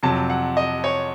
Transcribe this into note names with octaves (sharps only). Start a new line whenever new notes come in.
F2 C3 F#3 A5
F#5
D#5
C#5